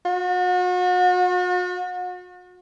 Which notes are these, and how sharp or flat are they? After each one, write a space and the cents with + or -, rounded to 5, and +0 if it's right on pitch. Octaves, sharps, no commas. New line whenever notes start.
F#4 -40